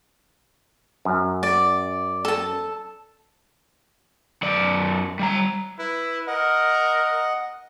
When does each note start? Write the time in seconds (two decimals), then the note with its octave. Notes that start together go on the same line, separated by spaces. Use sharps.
1.05 F#2
1.43 D5
2.25 A4 A5
4.42 F#2 D5
5.19 G3 A#5
5.79 E4 B4
6.27 A#4 D#5 F#5